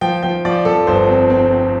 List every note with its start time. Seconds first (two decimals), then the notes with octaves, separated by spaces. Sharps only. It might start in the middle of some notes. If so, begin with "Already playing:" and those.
0.01 F3 G5
0.23 F3 G5
0.45 F3 D5
0.65 F2 A4
0.87 G1 C5
1.08 C4
1.30 C4
1.50 C4